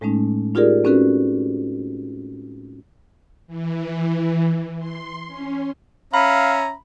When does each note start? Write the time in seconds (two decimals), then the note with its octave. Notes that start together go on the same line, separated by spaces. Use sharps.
0.01 A2 G#3 A3 C#4 D#4
0.55 D#4 F4 G4 G#4 A#4 D5
0.84 C4 C#4 D#4 F#4 A4 B4
3.47 E3
4.78 C6
5.27 C#4
6.14 C#4 E5 F5 A#5 B5